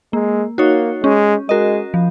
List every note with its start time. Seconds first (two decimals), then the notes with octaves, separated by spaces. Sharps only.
0.13 G#3 A#3
0.58 A#3 D#4 F#4 C#5
1.03 G#3 C#4
1.49 G#3 F#4 A#4 D#5
1.94 F3